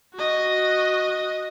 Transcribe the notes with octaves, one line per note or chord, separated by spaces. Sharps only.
F#4 D#5